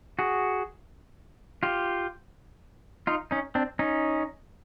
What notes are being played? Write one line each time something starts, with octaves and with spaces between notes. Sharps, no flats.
F#4 G#4
F4 G4
D#4 F4
C#4 D#4
C4 D4
C#4 D#4